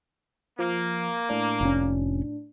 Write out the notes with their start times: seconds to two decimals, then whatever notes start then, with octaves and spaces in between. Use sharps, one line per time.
0.59 F3 A#3
1.29 A2 D4
1.61 F1 C#4